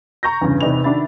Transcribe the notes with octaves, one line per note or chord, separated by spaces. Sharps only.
A#5 C#6 G6 A#6
E2 G2 C#3
E2 C3 D#4 B4 D5 F7
D#3 D4 F#4 E5 B5 A6